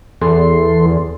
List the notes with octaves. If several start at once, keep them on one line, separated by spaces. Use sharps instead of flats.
E2 E3 A4 C6